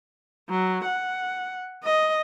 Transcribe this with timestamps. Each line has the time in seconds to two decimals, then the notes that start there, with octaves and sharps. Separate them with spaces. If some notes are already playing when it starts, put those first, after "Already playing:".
0.50 F#3
0.85 F#5
1.84 D#5